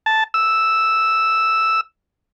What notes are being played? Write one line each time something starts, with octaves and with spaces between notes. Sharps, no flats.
A5
E6